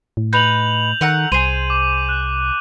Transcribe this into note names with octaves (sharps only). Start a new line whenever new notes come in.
A2
D#4 B4 G6 F7 F#7
D#3 A3 F#5 A#5
C2 G#4 C5 D#7
D6
F#6